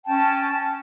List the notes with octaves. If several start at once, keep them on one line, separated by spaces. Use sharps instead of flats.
C#4 G5 A5